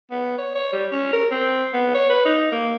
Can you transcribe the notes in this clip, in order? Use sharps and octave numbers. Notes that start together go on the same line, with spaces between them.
B3
C#5
C#5
G3
C#4
A#4
C4
B3
C#5
B4
D#4
A#3